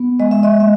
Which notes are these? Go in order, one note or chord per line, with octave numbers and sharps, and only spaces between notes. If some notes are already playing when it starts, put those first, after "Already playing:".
Already playing: B3
G#3 D#5
E5
D#5
A#3 E5